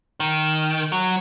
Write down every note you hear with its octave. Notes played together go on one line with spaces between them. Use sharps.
D#3
F#3